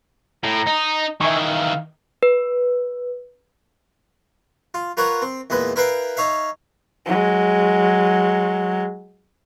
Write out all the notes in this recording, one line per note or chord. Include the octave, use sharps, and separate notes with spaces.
A2 A#5
D#4
D#3 E3 E5 G#5 C#6
F5
B4
F4
F4 A#4 B4 C#5 F#5
C4
E2 A#2 G#3 B4
E4 A#4 B4 F5 G5
D#4 C#5 E5 F5
F#3 G#3